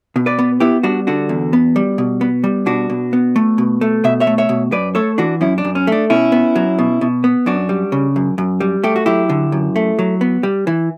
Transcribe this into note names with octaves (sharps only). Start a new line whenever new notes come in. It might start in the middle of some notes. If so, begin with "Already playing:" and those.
B2
B4 D5
B3
B3 E4 G4
G3 D4 F#4
D3 D4 F#4
E2
B3
G3
B2
B3
G3
B2 D4 F#4
B2
B3
A3
B2
A3
B2 E5
C#5 E5
A3
C#5 E5
B2
F#2 B4 D5
A3 A4 C#5
E3 D4 F#4
F#2 C#4 E4
D4
F#2
C#4
A3 D4
B2 C#4 E4
B3
F#3
B2
B2
B3
F#2 D4 F#4
G3
C#3
F#2
F#2
G3
A3 G4
F#4
F#3 E4 G4
D3
F#2
A3
F#3
B3
G3
E3